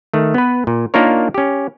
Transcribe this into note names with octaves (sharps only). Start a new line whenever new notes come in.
D#3 A3
B3 B4
A#2
A#3 D4 D#4 F4 A#4 C#5
C#4 G4